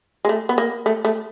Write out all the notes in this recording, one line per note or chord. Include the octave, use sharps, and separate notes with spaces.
G#3
A3
B3
A#3
A3
A3